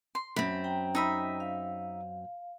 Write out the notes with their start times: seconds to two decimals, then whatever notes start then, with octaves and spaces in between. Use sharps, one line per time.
0.15 C6
0.36 F#2 C4 B5
0.64 G5 A#5
0.95 D#4 E5 B5
1.40 F5